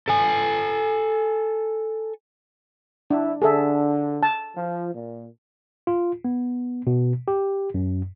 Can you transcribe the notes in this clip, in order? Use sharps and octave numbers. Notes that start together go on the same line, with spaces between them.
A4 G#5
D4 E4
D3 G#4 A4 E5
A5
F3
A#2
F4
B3
B2
G4
F#2